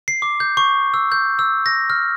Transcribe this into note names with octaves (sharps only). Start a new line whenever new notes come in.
C7
D6
G6
C#6
E6
G6
E6
A#6
F6